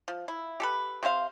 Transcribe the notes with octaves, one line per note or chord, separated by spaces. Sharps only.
F3
E4
G4 A4 B4
C3 C4 C5 F5